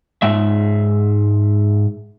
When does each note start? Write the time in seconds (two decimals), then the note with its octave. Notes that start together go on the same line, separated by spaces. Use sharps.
0.22 G#2 G#3 E5